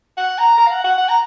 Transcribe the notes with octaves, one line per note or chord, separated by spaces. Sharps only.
F#5
A#5
A#5
F5
F#5
F#5
F#5
A#5